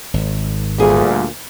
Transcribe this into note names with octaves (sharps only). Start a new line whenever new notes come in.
G#1
D2 A#2 G3 G#4